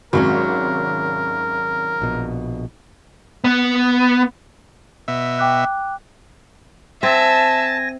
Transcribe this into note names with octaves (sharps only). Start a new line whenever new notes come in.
G#1 C3 F#3 G#3 C#4 A#4
A#1 B2
B3
B2 E5
G5 D6 F#6
C4 E5 G#5 A5 A#6